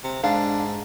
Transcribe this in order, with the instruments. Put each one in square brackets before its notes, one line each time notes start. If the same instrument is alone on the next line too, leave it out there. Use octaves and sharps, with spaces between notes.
[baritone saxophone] C3
[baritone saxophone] G#2 [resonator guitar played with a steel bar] D4 F5